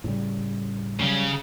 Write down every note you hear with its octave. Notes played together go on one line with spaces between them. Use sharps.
A2 C#3 G3
C#3 F#3 G3